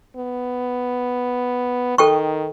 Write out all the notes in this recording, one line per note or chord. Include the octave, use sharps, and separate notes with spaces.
B3
D#3 A4 G5 C#6